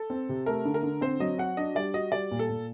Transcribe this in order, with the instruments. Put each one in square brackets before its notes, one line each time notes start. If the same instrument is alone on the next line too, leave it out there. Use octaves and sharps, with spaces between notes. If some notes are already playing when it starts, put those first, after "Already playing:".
Already playing: [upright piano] A4
[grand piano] C4
C3
[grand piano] A3 [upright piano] A#4
[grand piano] D3
[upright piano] A#4
[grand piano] D3
[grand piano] C4 [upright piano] C5
[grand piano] F#3 [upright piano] D#5
[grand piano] F#4 [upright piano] F#5
[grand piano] D4 [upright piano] D#5
[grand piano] G3 [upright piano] D5
[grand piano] F#4 [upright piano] D#5
[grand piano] G3 [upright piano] D5
[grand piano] A#2
[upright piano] A4
[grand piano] A#2